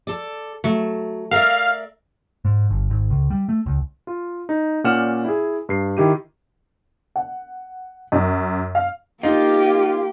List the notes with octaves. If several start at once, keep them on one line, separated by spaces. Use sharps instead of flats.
A4 D5
F#3 A3
A#4 D5 E5 F5
G#2
G1
G#1
C#2
G3
A3
C#2
F4
D#4
A#2 C#4 D5 F#5 F6 E7
E4 G#4
G2 C7
D#3 E4 G4 D#7
F#5
F#2
F5
A#3 D#4 F4 G4